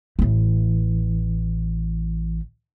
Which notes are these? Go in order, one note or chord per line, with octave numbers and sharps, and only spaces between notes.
A1 E3